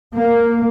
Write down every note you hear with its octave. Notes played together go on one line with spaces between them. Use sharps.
A#3